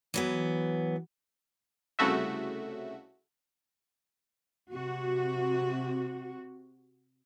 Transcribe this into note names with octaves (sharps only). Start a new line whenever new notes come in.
E3 F#3 B3
C2 C#3 A3 F#4 E5
C3 F#4